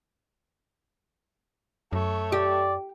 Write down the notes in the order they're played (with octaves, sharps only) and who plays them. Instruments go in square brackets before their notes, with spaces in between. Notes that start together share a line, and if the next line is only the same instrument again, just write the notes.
[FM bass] F#2 [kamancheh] A3 C#5
[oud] G4 [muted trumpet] D5